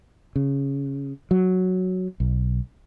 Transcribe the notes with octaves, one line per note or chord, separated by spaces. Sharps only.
C#3
F#3
B1